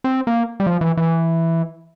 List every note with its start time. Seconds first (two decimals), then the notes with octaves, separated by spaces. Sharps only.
0.04 C4
0.27 A#3
0.60 G3
0.67 F3
0.81 E3
0.97 E3